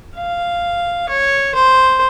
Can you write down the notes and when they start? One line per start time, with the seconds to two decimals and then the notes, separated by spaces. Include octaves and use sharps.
0.17 F5
1.09 C#5
1.55 C5